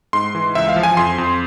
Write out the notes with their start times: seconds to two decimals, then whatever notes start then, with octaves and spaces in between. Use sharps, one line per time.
0.13 G#2 C6
0.35 E3
0.55 C#2 E5
0.69 F5
0.76 F3
0.83 G#5
0.97 F2 C6
1.18 F2